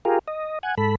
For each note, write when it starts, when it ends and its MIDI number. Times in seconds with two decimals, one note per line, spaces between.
0.05 0.19 65
0.05 0.19 67
0.05 0.19 68
0.05 0.19 70
0.28 0.59 75
0.63 0.75 78
0.63 0.75 80
0.78 0.95 44
0.78 0.95 69
0.78 0.95 83